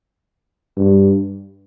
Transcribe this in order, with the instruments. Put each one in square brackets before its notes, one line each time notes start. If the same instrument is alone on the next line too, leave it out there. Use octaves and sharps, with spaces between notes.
[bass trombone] G2